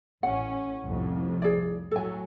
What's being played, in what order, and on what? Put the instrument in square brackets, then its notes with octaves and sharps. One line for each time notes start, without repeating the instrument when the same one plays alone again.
[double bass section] A1 C#4 [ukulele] F#5
[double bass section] C2 F2 A2
[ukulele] G#4 D5
[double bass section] A2 F#3 [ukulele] A4 G#5